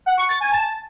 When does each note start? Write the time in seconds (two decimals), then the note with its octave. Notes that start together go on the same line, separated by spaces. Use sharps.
0.06 F#5
0.18 C#6
0.29 A6
0.40 G#5
0.52 A5